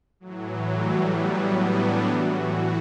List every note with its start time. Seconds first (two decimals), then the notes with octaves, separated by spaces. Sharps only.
0.20 A2 E3 F#3
0.67 G3
1.13 B3
1.60 D4
2.07 A2 E3 F#4